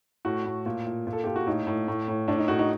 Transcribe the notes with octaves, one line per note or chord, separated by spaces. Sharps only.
A2 F#4
A2
A#2
A#2
A#2
A4
A#2 G4
F#4
A2 D#4
A2
A2
A2
A2 D4
D#4
A2 F#4
D#4